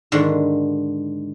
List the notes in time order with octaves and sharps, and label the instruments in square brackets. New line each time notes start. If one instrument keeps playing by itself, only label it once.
[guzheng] G#2 D3 D#3